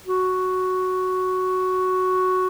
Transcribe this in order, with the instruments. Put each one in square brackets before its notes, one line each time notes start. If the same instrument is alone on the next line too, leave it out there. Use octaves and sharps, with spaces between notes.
[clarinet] F#4